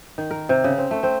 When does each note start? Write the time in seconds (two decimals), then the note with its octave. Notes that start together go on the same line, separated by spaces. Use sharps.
0.18 D#3
0.31 A#4
0.49 C3
0.64 C#3
0.78 C4
0.91 A3
1.03 C4